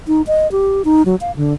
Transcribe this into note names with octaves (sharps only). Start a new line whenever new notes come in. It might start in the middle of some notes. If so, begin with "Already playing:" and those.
D#4
D#5
G4
D#4
F#3
F5
D3